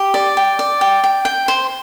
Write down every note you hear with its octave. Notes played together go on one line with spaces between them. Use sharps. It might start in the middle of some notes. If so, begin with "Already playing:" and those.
Already playing: G4
D5
G5
D5
G5
G5
G5
C5